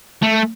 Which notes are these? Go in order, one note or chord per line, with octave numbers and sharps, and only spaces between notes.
A3